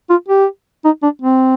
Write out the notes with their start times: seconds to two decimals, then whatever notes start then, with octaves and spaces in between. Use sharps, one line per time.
0.10 F4
0.29 G4
0.85 D#4
1.03 D4
1.22 C4